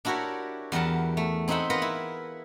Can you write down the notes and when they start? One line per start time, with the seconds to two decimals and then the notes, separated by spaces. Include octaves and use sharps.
0.05 D4 E4 F#4 G4 A#4 C#5
0.72 E2 G3 A#4 F#5 A5
1.17 A3
1.48 C4 D#4 G#4 E5 F#5 B5
1.70 F4 A#4 B4 D#5 F#5
1.82 E4